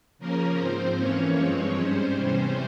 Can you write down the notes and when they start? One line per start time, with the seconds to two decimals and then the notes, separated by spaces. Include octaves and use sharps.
0.19 C#3 F3 A#3 C#4 A#4
0.59 G#2 F3 C4 C5
0.98 F2 E3 A#3 C#4 C#5
1.37 G2 F3 G#3 C4
1.77 G#2 G3 C#4 C5
2.16 E2 C3 E3 G3 C#4